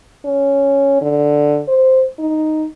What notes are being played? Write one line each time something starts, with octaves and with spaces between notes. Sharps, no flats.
C#4
D3
C5
D#4